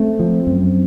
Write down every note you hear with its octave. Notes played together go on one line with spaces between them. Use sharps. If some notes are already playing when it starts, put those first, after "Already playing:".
Already playing: A3 C4
F3
F#2